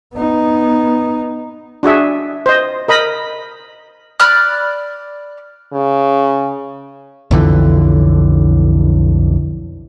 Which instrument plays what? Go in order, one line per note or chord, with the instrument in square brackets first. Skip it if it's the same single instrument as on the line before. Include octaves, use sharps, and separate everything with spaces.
[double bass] B3 D#4
[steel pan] D4 F#4 G#4 E5
C5 D#5
A#4 D#5 B5
[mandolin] D5 B5 F6 F#6
[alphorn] C#3
[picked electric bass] B1 F2 D3 E3